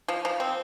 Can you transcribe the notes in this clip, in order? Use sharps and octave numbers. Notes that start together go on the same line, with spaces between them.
F3
F3
C4